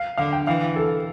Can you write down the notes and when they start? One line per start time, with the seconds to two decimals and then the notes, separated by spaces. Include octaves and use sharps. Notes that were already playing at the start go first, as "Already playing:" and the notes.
Already playing: F5
0.17 D3 F5
0.33 G5
0.47 E3 F5
0.76 A4